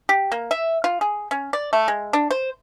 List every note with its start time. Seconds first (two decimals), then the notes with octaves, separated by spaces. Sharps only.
0.09 G4
0.32 A#3
0.51 E5
0.84 F4
1.01 G#4
1.31 C#4
1.53 D5
1.73 A3
1.88 G#3
2.13 D4
2.31 C5